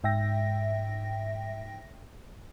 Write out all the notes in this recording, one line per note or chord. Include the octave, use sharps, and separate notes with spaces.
G#2 E5 G5 A#6